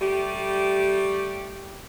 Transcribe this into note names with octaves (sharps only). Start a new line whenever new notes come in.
G3 A3 G4